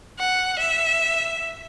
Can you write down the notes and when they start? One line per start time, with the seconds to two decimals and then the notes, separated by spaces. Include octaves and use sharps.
0.19 F#5
0.59 E5